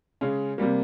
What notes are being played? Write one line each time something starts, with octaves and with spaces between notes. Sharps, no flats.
C#3 G#3 C#4
C3 G3 A#3